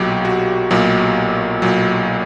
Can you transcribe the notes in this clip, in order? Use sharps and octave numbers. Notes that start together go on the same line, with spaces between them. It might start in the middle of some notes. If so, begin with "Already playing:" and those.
Already playing: B1 A#2 F#3 G4
F#4
B1 A#2 F#3
B1 A#2 F#3